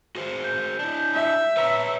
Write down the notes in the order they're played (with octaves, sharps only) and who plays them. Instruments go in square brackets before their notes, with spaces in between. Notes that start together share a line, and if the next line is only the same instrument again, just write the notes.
[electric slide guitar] F#4 G#4 C5
[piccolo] G6
[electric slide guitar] D4 E4
[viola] E5
[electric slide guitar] B4 C#5 A#5 [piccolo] E6